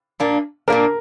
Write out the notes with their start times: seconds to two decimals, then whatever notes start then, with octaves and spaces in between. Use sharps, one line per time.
0.20 A#2 A#3 D4
0.68 A#2 A#3 D4 A#4